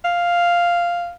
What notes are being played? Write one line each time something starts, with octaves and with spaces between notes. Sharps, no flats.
F5